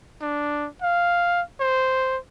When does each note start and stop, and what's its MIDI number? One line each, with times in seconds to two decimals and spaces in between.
0.22 0.68 62
0.82 1.41 77
1.60 2.17 72